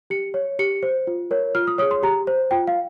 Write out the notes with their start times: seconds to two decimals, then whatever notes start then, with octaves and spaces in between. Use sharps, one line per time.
0.10 G4 C#7
0.34 C#5
0.59 G4 C#7
0.83 C5
1.07 F4
1.31 A#4 C#5
1.55 F4 F6
1.67 D#6
1.78 C#5 D#6
1.82 G#4
1.91 C6
2.03 G4 A#5
2.27 C5
2.51 F4 G5
2.67 F5